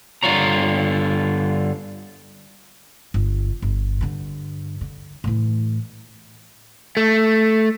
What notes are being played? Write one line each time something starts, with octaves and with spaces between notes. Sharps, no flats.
G2 D3 E3 F4 C#5 A#5
G1
G1
G2 D3
D3
A2 E3
A3